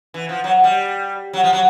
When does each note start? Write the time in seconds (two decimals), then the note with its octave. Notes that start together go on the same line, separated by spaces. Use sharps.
0.14 E3
0.29 F3
0.44 F#3
0.64 G3
1.33 F#3
1.44 F3
1.53 F#3